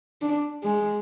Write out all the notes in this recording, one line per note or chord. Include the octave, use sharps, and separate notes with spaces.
D4
G#3